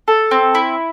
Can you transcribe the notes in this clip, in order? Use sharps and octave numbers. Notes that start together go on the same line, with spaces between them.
A4
C4
E4